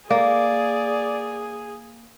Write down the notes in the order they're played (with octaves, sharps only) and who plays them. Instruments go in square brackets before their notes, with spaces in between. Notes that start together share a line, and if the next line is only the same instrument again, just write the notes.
[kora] A#3 [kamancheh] G#4 [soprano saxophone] D5